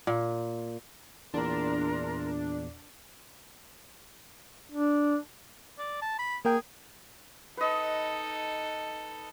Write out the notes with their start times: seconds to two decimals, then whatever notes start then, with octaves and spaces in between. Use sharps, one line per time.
0.07 A#2
1.34 E2 A#2 D4 A#4 C6
4.72 D4
5.79 D5
6.02 A5
6.19 B5
6.45 A#3 G#4 A#4 G5
7.57 D#4 A4 B4 D#5